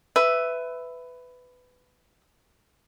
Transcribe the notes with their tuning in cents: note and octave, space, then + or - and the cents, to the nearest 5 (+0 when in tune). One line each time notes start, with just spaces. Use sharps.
B4 +15 E5 +0